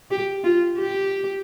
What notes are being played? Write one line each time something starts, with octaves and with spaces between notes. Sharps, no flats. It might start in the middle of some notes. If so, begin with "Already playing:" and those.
G4
F4
G4